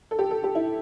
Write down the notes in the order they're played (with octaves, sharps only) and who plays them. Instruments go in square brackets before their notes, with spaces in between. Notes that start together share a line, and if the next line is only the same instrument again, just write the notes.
[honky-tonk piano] A4
G4
A4
G4
E4